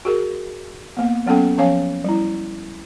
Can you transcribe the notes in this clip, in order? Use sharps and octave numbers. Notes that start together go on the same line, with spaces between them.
F#4 G#4 A#4
A#3 B3
F#3 B3 C#4 A4 G5
F3 C#4 C#5 F5 G#5
G3 E4